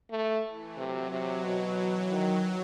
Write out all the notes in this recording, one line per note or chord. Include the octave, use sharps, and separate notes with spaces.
A3
E3
C3 F#3
C3
B2
E3
D#3 F#3